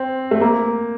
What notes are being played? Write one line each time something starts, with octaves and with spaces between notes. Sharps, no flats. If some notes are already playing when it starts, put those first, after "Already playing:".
Already playing: C4
A3
A#3